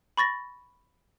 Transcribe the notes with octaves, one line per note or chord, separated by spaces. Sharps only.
B5 C#6 A6 A#6